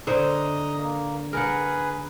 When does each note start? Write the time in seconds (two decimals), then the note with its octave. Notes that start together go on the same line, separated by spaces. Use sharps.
0.07 D3 C5 D#5 A#5 D#6
0.78 A#3
1.33 G#4 A#4 B4 F#5